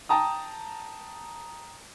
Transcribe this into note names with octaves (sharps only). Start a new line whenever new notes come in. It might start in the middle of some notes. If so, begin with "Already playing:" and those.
G5 A5 A#5 D#6